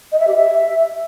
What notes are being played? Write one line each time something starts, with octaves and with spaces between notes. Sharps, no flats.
D#5
E5
G4
E5